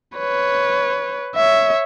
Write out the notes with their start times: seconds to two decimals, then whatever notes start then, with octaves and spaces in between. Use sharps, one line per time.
0.18 B4 C#5
1.35 C#5 E5